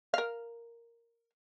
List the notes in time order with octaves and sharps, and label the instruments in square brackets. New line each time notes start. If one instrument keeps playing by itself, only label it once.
[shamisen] A#4 F5